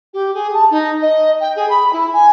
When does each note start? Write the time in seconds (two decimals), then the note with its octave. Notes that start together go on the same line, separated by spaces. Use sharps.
0.13 G4
0.34 G#4
0.53 A5
0.70 D#4
1.02 D#5
1.40 G5
1.56 G#4
1.69 B5
1.93 E4
2.13 G#5